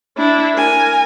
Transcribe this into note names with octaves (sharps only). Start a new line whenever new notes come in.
D4 E4
A#4 G#5